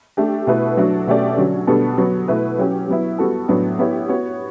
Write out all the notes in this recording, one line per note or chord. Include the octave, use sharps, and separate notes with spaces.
A3 D4 G4
B2 A3 E4 B4
F#3 A3 D4 F#4
B2 A3 C#4 G4 D5
D3 F#3 C#4
B2 G3 B3 D4 A4
F#3 B3 F#4
B2 A3 E4 B4
F#3 C#4 G4
F#3 B3 E4
G3 B3 F#4 A4
A2 F#3 B3 D4
B3 E4 G4 C#5
B3 F#4 C#5